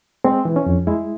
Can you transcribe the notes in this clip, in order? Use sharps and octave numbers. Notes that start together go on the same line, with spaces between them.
G#3 C4
E3
C#4
F2
G#3 E4